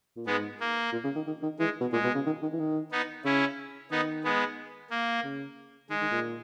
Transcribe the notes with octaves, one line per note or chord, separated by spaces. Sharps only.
A#2
G#2 G#3 B3
A#3
A#2
C#3
D#3
D#3
D#3
E3 G#3
B2
A#2 G#3
B2
C#3
D#3
D#3
E3
D#3
B3 D#4
C#3 C#4 E4
D#3 B3 D#4
G#3 B3
A#3
C#3
D#3 G#3
D#3
A#2